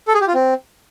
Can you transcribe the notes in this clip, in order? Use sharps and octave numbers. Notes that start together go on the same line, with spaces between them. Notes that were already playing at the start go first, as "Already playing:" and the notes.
A4
G#4
G4
F4
C4